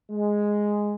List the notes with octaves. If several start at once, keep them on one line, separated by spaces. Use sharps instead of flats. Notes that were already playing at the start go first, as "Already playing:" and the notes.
G#3